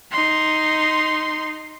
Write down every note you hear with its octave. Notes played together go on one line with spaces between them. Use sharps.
D#4 C6